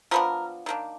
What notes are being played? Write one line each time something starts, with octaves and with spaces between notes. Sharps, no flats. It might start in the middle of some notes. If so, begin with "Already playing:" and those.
F3 B3 D4 A#4
D#3 A#3 D4